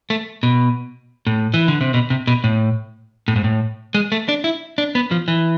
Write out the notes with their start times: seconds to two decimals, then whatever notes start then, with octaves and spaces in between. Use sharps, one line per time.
0.10 A3
0.43 B2
1.27 A2
1.54 E3
1.68 D3
1.81 C3
1.94 B2
2.10 C3
2.27 B2
2.44 A2
3.28 A2
3.36 G#2
3.44 A2
3.94 G#3
4.12 A3
4.29 D4
4.44 E4
4.78 D4
4.95 B3
5.11 F3
5.28 E3